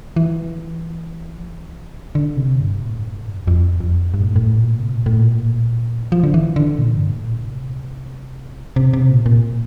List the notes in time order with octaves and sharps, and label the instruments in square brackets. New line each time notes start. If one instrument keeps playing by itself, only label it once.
[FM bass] E3
F3
E3
D3
C3
G2
A2
G2
A2
G2
E2
F2
F2
G2
A2
G2
A2
A#2
C3
A#2
A2
A#2
F3
D3
E3
D3
A#2
G2
A2
A#2
C3
C3
C3
A#2
A#2